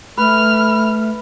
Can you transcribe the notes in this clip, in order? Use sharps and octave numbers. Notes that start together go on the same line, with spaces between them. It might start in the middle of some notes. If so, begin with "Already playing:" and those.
A3 B4 F6